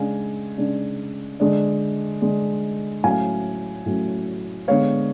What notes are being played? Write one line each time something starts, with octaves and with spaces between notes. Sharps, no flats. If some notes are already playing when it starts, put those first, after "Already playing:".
Already playing: C#3 G#3 D4 F5 G#5
C#3 G#3 D4
D3 G#3 D4
D3 G#3 D4
A2 F#3 C#4 F5 G#5
A2 F#3 C#4
D3 G#3 B3 C#5 F5